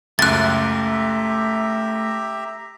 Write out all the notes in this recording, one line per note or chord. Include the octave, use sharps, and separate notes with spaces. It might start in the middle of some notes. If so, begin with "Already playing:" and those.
C#2 F#2 A3 G4 E5 A#5 F#6 A6